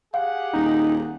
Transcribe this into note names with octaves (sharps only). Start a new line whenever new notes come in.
G4 G#4 F5 F#5
D#1 D#4